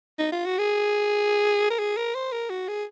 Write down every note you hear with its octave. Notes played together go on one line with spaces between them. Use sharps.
D#4
F4
F#4
G#4
A#4
G#4
A#4
C5
A#4
F#4
G#4